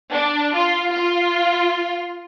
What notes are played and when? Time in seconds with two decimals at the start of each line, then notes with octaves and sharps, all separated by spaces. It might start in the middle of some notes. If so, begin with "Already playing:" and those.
0.10 D4
0.54 F4
0.92 F4